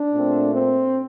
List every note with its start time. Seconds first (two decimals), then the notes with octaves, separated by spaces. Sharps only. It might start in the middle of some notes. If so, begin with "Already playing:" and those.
Already playing: D4
0.13 A#2 A3 C4
0.54 C4